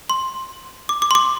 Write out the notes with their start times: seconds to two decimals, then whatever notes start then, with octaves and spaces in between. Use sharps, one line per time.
0.10 C6
0.89 D6
1.02 D6
1.11 C6
1.15 D6